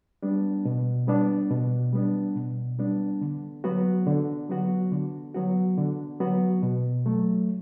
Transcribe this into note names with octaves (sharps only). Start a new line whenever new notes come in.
G3 B3 D4
B2
G3 B3 D4
B2
G3 B3 D4
B2
G3 B3 D4
D3
F#3 B3 F#4
D3
F#3 B3 F#4
D3
F#3 B3 F#4
D3
F#3 B3 F#4
B2
F#3 A3